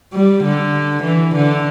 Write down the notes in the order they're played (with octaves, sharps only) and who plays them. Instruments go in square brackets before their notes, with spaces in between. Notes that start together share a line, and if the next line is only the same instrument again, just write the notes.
[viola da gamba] G3
D3
E3
D3